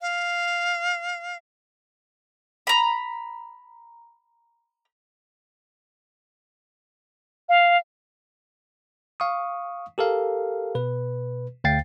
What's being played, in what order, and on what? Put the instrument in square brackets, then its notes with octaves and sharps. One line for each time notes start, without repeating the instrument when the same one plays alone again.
[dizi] F5
[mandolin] A#5 B5
[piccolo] F5
[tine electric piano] F5 C#6 D#6
G4 A4 A#4 F5
B2 B4
D2 F5 G5 A6 C7